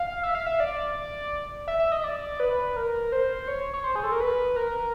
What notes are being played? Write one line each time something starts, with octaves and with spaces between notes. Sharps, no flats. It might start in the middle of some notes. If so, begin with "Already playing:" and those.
Already playing: F5
E5
F5
E5
D5
E5
E5
D#5
D5
B4
A#4
C5
C#5
C#5
C5
G#4
A4
A#4
B4
A#4